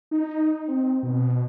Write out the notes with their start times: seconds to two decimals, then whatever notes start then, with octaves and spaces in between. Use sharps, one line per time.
0.11 D#4
0.68 C4
1.03 B2